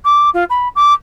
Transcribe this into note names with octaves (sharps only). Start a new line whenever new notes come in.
D6
F4
B5
D6